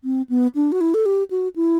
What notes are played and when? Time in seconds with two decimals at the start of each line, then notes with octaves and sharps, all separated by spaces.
0.04 C4
0.29 B3
0.55 D4
0.72 F#4
0.81 E4
0.94 A4
1.06 G4
1.31 F#4
1.56 E4